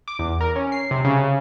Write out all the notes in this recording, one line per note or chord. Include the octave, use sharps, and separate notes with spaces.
D6
E2
A#4
C#4
C7
C3
C#3